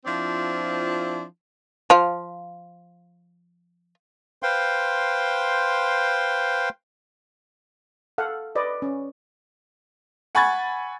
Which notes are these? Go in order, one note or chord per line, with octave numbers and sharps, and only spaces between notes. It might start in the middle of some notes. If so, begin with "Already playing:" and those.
F3 C4 D4 E4 F4
F3 F4
B4 C5 F5 G5 C6
A4 F5 F#5
B4 D5 D#5
C#4
F#5 G#5 B5 C#6 G#6 A6